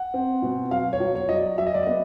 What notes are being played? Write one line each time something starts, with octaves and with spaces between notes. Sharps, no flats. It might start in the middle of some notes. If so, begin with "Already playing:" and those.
Already playing: F#5
C4
B2
F#3 F5
C#5
F#3
C#5
F#3 D#5
D5
F#3 E5
D#5
D5
B3 D#5